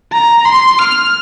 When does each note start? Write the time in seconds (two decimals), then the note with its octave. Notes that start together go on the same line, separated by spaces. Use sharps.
0.12 A#5
0.45 C6
0.78 F6